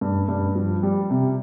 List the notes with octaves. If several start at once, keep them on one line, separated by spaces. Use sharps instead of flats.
G2
G2
F3
G3
C3